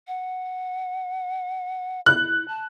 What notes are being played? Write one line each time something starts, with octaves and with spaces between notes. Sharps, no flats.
F#5
E4 F#6
A5